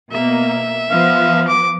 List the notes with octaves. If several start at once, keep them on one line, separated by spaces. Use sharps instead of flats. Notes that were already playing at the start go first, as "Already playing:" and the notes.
B2 A#3 E5
F3 B3 F5
D6